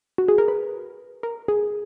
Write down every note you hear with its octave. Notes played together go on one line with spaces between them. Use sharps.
F#4
G#4
A#4
B4
A#4
G#4